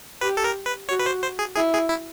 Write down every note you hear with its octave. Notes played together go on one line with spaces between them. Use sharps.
G4 B4
A4
A#4
B4
F#4 C#5
B4
C5
C5
G#4
E4 G#4
G#4
E4